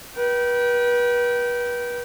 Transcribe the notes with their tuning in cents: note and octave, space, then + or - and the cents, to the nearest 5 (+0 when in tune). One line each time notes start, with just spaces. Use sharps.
B4 -35 G5 -20